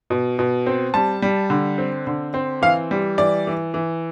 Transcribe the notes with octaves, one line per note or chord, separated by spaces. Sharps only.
B2
B2
C4
G3 A5
G3
D3
C4
D3
C4
E3 F5
G3
E3 D5
E3
E3